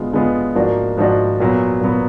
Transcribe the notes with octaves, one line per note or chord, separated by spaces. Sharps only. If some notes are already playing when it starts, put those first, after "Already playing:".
Already playing: D3 G#3 B3 F4
D3 G#3 B3 F4
G#2 F3 A#3 D4 F#4
G#2 F3 A#3 D4 F#4
A#2 F#3 B3
A#2 F#3 B3